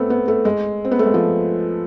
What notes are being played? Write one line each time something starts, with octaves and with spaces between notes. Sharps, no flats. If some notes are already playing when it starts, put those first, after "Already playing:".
Already playing: A3 B3 C4
B3
A3
G#3
C4
B3
A3
G#3
F3